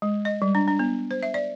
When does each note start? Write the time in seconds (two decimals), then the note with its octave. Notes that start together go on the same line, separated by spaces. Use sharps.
0.02 G#3
0.25 D#5
0.42 G3
0.55 D4
0.68 D4
0.79 B3
1.11 C5
1.23 E5
1.34 D5